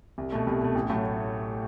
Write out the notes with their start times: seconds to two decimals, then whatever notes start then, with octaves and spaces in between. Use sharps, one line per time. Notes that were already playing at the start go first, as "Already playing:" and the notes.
0.18 C2
0.32 B2 A3
0.47 C2
0.61 B2 A3
0.75 A1
0.90 A2 F#3 A3